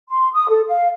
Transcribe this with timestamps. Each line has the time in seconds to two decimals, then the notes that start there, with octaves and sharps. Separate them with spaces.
0.10 C6
0.33 D#6
0.49 A4
0.68 F5